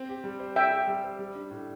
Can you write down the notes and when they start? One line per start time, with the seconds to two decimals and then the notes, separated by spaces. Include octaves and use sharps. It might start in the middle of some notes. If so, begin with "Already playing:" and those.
Already playing: C4
0.09 G4
0.24 G3
0.40 C5
0.56 C4 E5 G5
0.72 G4
0.87 G3
1.04 C5
1.19 G3
1.35 D4
1.51 A2